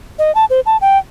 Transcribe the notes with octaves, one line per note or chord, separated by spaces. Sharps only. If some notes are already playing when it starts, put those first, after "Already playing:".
D#5
A5
C5
A5
G5